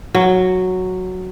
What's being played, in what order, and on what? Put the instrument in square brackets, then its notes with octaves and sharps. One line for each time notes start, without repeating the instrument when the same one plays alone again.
[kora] F#3